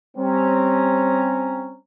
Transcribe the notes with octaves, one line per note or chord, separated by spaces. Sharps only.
G3 C4 C#4 A#5